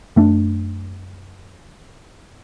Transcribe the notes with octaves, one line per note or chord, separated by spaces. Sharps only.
F#2 A3 D4